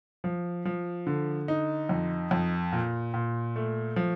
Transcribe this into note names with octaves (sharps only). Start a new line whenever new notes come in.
F3
F3
D3
D#4
F2
F2
A#2
A#2
A3
F3